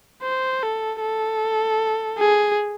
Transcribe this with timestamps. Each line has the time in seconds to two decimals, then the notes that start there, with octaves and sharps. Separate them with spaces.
0.23 C5
0.62 A4
1.01 A4
2.19 G#4